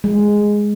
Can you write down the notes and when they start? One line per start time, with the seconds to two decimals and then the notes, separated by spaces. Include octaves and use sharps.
0.04 G#3